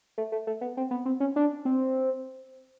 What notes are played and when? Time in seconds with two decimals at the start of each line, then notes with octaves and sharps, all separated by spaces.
0.18 A3
0.32 A3
0.47 A3
0.61 B3
0.77 C4
0.91 B3
1.06 C4
1.20 C#4
1.36 D4
1.65 C4